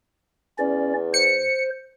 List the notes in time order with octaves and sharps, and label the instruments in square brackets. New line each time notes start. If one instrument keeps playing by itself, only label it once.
[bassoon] E2 [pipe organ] C#4 D5
[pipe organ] C5 [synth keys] C#7